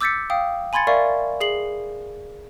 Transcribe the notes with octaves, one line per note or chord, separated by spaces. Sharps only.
D6 E6 G6 A6 B6 C#7
F5 G5 D#6
G#5 B5 C6 G#6 A6 C#7
A#4 D5 E5 F5 C#6
G#4 C7 F#7